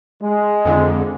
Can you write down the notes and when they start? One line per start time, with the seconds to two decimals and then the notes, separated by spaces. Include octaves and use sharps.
0.22 G#3
0.65 F2 D3